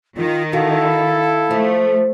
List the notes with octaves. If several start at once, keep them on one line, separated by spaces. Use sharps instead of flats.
D#3 F4
E4 F#4 A4 F5
F3 A3